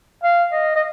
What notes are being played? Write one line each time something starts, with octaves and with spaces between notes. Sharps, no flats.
F5
D#5
D#5